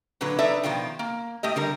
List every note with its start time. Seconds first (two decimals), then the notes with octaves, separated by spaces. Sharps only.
0.21 A#2 D3 F#3 B4
0.39 D4 D#4 A4 B4 D5 E5
0.63 B2 D#3 F3 F4 G5
0.99 A#3
1.43 A2 A3 G4 D#5
1.56 D3 G3 A#4